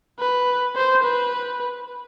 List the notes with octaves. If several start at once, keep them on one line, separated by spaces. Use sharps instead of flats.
B4
C5
B4